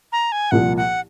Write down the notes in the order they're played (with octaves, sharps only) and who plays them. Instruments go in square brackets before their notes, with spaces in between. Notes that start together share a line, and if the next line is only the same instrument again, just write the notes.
[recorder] A#5
G#5
[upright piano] C2 A#2 F3 [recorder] F#5
[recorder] F#5